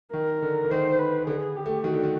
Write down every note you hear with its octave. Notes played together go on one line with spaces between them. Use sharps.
D#3 A#4
D3
D3
D#3 C5
B4
D3 G#4
G4
A3
D#3 F#4
D3
D#3